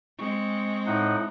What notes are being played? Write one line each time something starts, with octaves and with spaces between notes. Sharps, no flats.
G#3 C4 C#6
A2 D#4 F#5